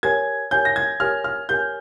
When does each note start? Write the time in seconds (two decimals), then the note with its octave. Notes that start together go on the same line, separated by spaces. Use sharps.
0.03 G4 A#4 C#5 G#5 G#6
0.51 G4 A#4 C#5 G#5 G6
0.65 A#6
0.76 G#6
1.00 G4 A#4 C#5 G#5 F6
1.24 F6
1.49 G4 A#4 C#5 G#5 G6